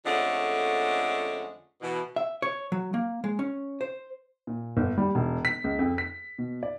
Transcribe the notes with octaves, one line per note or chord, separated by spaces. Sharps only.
F2 D3 G#3 A3 C#4 F#5
B2 E3
E5
C#5
F#3
A#3
G#3
C#4
C5
A#2
G1
G3
E1
B6
C#2
F2
B6
B2
D5